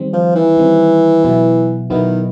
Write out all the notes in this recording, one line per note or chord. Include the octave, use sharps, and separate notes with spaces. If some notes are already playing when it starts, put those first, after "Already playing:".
Already playing: D#3 G3 C4
F3
E3
D#3 G3 C4
B2 F#3 B3 E4
B2 D#3 F#3 B3 E4